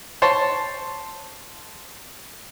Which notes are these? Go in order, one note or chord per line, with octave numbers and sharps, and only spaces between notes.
C5 C#5 A5